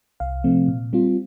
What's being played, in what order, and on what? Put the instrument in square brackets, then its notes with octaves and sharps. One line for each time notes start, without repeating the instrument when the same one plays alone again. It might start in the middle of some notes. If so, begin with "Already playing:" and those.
[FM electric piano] C2 F5
C3 F3 A3 C4
A#2
G3 C4 F4